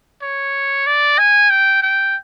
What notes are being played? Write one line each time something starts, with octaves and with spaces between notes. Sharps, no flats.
C#5
D5
G#5
G5
G5